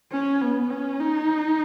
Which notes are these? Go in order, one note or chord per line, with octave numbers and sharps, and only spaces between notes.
C#4
B3
C#4
D#4